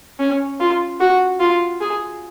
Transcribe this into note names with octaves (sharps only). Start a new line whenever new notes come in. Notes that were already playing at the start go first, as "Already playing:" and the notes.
C#4
F4
F#4
F4
G#4